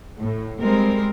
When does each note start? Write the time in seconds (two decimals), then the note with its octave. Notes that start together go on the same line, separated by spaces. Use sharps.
0.18 A2
0.61 G3 G#3 C4 A#4